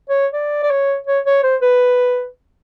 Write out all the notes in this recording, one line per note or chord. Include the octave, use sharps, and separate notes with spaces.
C#5
D5
D5
C#5
C#5
C#5
C5
B4